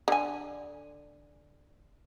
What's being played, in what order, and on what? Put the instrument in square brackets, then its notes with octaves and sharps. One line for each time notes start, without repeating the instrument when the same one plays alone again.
[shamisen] D3 G#5